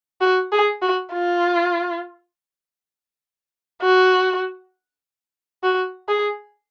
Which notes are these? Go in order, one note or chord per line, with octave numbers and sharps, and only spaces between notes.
F#4
G#4
F#4
F4
F#4
F#4
G#4